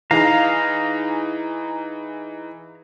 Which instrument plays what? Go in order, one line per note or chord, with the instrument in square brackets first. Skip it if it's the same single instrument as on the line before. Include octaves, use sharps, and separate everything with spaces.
[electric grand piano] E3 D#4 G#4 [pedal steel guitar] F5 A#5